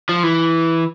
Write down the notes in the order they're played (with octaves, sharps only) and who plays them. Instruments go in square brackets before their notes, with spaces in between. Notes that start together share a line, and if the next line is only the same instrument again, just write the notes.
[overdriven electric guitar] F3
E3